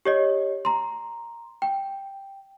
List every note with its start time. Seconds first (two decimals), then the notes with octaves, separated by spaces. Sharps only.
0.05 G4 C#5 D#5
0.65 A#5 C6
1.62 G5